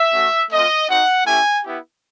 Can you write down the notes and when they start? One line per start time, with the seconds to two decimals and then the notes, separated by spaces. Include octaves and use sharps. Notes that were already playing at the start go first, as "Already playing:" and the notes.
Already playing: E5
0.13 A3 C#4 F#4
0.51 A3 C4 F4 D#5
0.89 C4 D#4 F#4 F#5
1.26 A3 C#4 E4 G4 G#5
1.64 B3 E4 G4